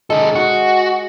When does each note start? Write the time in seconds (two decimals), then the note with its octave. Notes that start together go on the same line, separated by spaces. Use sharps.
0.10 D#3 G#3 A4
0.35 F#4